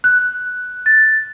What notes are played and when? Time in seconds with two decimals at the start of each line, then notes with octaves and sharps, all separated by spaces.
0.04 F#6
0.86 A6